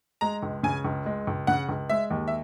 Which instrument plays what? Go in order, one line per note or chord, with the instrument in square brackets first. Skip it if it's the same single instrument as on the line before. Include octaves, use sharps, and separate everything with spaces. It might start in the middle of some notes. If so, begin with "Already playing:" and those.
[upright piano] G#3 [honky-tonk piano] A#5
[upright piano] C#2
[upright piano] C#3 [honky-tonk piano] G#5
[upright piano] C#2
G#3
C#2
[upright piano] C#3 [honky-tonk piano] F#5
[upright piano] C#2
[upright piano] G#3 [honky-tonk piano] E5
[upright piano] D#2
[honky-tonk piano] E5